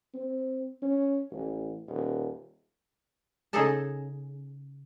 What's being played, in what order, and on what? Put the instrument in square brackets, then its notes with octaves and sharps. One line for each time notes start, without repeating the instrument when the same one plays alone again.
[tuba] C4
C#4
A1
D#1
[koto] C#3 D#4 G#4 A4 D#5 A5